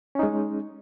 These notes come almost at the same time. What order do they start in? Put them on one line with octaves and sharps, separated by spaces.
C#4 D#4 G#3